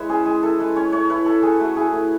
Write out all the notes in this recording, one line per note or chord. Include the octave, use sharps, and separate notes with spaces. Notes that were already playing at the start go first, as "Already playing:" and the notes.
Already playing: G#3 E4 B4 C#5 E5
C#4 G#4
G#3 G#4
E4 A4
G#3 B4
C#4 C#5
A3 C#5
E4 B4
A3 A4
C#4 G#4
A3 F#4
E4 G#4
A3